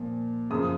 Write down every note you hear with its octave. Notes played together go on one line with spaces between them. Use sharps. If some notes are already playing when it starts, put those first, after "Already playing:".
Already playing: A#2 F3
F#2 C#3 F3 D#6